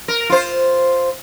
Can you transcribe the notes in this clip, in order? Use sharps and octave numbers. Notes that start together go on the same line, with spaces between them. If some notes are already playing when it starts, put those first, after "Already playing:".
A#4
F4 C5